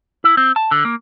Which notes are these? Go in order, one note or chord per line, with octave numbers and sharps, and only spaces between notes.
E4
C4
A5
D3
A#3